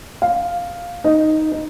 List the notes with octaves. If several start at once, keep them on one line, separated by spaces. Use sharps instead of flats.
F5
D#4
D#4